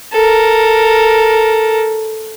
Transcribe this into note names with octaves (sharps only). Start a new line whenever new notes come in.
A4 A#4